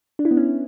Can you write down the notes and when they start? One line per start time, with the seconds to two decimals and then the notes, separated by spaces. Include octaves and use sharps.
0.19 D4
0.25 E4
0.31 B3
0.37 C#4